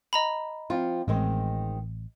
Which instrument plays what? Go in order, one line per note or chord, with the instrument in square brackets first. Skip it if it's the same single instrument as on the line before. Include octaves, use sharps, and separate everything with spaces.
[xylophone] D#5 A#5 B5
[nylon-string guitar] F3 C4 F4
[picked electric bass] A1 [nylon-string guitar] D#3 G#3 C4